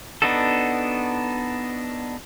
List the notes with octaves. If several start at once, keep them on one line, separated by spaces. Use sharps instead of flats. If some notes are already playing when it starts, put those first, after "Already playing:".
B3 D4 D#4 F#4 A4